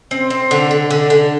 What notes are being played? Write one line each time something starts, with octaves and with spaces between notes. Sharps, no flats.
C4
C4
D3
D3
D3
D3